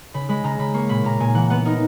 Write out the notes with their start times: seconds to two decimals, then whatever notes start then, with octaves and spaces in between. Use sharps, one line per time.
0.14 C#3 B5
0.29 G#3 B5
0.44 C#3 A#5
0.59 C#3 B5
0.74 A#3 C#6
0.89 A#2 B5
1.04 A#2 A#5
1.20 A#2 G#5
1.34 E3 F#5
1.50 B3 F#5
1.65 D#4 A#4